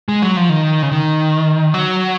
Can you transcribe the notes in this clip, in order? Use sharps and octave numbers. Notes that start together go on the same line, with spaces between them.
G#3
F#3
F3
D#3
C#3
D#3
F#3